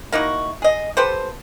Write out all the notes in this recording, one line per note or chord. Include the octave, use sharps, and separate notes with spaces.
A#3 D#4 E4 F#4
G#4 D#5
G4 A4 B4 C5